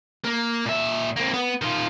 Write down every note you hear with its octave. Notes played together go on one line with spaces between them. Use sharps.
A#3
A#2 E5
A#3 C4
B3
D#3 F4